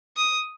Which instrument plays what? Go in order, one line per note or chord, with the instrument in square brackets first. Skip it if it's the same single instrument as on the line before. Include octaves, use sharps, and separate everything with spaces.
[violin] D#6